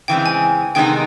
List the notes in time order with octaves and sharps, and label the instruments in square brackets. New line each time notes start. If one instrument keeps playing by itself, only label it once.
[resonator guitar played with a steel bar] C#3 E3 G#3 C4 [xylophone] G5
[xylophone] G#5
[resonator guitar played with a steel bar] C3 D#3 G#3 B3 D#4 [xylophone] G5